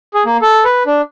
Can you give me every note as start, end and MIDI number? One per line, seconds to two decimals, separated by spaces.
0.14 0.24 68
0.26 0.37 58
0.42 0.64 69
0.65 0.83 71
0.86 1.01 62